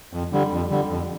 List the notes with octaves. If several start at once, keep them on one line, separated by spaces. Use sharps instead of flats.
F2
D3 G3
F2
D3 G3
F2